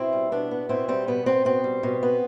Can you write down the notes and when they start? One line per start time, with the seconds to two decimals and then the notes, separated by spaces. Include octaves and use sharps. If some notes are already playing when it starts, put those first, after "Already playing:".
Already playing: B2 C4 E4
0.13 G3
0.32 B2 B3 D4
0.51 B3
0.69 B2 C4 E4
0.88 G3 C4
1.07 B2 B3
1.26 B3 C4
1.45 B2 C4
1.64 G3
1.83 B2
2.03 B3